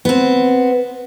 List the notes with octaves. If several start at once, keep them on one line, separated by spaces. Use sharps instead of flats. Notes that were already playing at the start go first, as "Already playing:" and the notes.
B3 C4